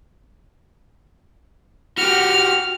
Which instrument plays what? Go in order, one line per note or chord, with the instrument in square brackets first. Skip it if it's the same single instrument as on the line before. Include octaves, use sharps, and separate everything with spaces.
[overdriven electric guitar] F#4 G4 [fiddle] F6